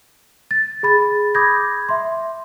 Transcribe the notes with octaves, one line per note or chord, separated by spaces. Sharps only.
A6
G#4 B5 A6
B5 D6 D#6 G6 G#6 A#6
E5 C6